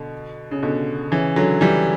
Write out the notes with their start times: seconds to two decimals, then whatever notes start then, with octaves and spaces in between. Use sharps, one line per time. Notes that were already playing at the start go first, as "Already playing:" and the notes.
Already playing: B2 D3
0.51 C#3
0.62 B2 D3
1.12 C#3 E3
1.36 D3 F#3
1.61 E3 G3